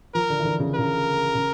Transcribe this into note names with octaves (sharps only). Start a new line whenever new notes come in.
F3 A#4
D3
E3
D3
C#3
C#3 A#4
C#3